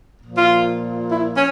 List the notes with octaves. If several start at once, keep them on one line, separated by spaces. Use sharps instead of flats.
A#2 F3
F4
E4
C#4